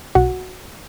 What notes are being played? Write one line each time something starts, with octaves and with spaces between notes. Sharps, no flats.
B1 F#4